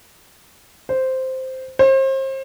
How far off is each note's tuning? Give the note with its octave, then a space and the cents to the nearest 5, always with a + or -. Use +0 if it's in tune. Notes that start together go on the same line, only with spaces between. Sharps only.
C5 -5
C5 +35